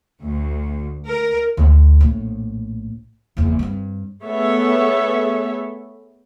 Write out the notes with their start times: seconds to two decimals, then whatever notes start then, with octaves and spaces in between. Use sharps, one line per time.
0.24 D2
1.07 A#4
1.57 D2
2.01 A#1 A2
3.37 F#1 E2
3.59 G2 C4
4.25 A3 B3 G#4 A4 C#5 E5